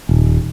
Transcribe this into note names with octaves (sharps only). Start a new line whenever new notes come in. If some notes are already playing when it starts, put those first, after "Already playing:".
D#1